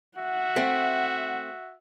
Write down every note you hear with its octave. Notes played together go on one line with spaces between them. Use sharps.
F#4 E5 F#5
A3 C4